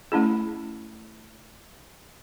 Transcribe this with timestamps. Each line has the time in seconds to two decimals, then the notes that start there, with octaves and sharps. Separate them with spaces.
0.12 A3 C#4 E4 G#4